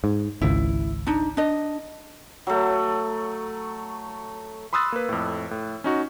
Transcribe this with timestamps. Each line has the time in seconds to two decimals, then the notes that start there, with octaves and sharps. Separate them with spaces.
0.04 G#2
0.42 G#1 C#2 E4
1.07 D4 D#4
1.37 D4 D#5
2.47 F#3 A3
4.73 B5 C6 D#6 E6 F#6 A6
4.92 A#3 B4
5.09 F2 A2
5.51 A2
5.84 C#4 D#4 F#4